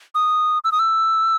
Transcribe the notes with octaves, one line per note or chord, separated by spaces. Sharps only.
D#6
E6
D#6
E6